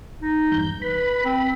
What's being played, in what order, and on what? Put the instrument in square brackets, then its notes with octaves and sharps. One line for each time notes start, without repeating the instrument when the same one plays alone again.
[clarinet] D#4
[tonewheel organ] E2 G2 G6
[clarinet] B4 [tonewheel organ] B5
[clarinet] C4